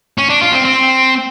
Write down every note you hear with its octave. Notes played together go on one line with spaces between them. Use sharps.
C#4
D4
F4
C4
C4